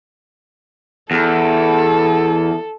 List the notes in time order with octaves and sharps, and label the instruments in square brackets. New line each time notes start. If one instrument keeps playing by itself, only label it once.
[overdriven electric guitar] E2 [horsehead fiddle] A4